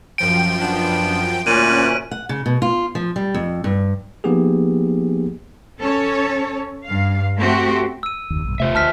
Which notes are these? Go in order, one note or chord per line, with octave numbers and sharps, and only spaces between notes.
F#2 F3 G5 D7
B3 D4
D2 A#2 C#4 F#6 D#7
F#5
C#3
B2
F4
F3
G3
F2
G2
F3 A#3 B3 D#4 G4 G#4
C#4 A4 C#5
G2 F5
A3 C4 F#4 G4
E6 D#7
F#1 D#2
B1 G2
E1 C3 A3 F4 C5 E5
D2 A5 F6 B6